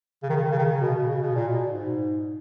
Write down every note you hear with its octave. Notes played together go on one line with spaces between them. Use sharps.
C#3
D#3
C#3
D#3
C#3
D#3
C#3
B2
B2
C#3
B2
A#2
B2
G#2